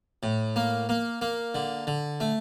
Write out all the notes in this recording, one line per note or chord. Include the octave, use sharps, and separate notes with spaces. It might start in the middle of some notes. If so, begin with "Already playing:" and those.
A2
A#3
A#3
A#3
D3
D3
A3